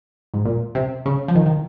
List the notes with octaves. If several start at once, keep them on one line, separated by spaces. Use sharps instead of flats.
G#2
A#2
C3
C#3
F3
D#3
D#3